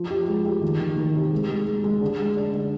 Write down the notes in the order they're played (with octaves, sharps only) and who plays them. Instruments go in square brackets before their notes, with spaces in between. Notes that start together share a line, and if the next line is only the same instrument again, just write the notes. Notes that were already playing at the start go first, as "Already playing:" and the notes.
Already playing: [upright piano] F3
G4
G#3
G4
D#3
D#3
D#3
C3
G#3
G#3
G#3
G#3
D3
G#3
D4
D4